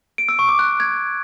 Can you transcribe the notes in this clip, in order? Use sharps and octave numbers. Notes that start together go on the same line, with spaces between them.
D7
E6
C#6
D6
F#6
G#6